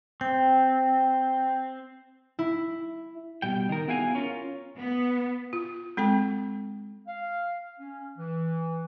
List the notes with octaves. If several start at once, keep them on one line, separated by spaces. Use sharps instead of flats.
C4 G5
E4
B2 G3 G5
D#3 A#4
B3 E4 F#4 G#4 F5 G#5
C#4 F4 A#4
B3
F4
G#3 C4 A4 G5
F5
C#4
E3